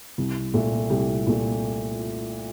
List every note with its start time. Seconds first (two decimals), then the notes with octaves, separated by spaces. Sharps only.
0.18 C2
0.54 A#2 A3
0.90 C2 G4
1.27 A#2 A3